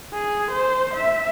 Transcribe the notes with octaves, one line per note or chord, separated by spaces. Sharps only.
G#4
C5
E5